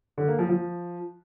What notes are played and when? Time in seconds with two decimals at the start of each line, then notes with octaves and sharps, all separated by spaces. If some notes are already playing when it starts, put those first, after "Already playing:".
0.18 D3
0.28 A#3
0.39 F3
0.49 F3